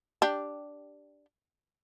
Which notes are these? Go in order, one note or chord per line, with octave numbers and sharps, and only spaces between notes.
D4 G4